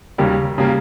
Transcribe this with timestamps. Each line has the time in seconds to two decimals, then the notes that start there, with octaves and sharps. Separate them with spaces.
0.18 D#2 C#3 G3 A#3
0.58 C#3 G3 A#3